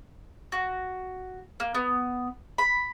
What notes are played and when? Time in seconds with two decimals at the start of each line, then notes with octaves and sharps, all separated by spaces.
0.52 F#4
1.60 A#3
1.75 B3
2.58 B5